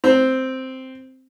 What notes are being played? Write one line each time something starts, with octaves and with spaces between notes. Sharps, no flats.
C4